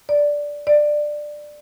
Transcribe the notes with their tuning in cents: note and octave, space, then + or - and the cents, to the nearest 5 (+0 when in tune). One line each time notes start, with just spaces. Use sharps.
D5 -5
D5 +15